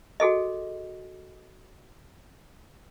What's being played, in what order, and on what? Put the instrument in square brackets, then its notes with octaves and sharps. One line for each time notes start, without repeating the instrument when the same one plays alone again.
[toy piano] F#4 G#4 A4 D#5